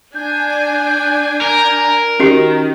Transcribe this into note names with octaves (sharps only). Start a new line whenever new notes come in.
D4 G#5 G6
A#4
D#3 C#4 F#4 G4